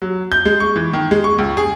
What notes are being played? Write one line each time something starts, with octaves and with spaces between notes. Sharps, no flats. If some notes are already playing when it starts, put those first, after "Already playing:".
F#3
G6
G#3
C#6
E3
D#3
G#3
C#6
C#2
G#4